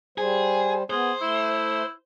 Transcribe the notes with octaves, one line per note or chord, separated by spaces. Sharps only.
G3 G#4 C5
B3 G#4 C5
A3 E4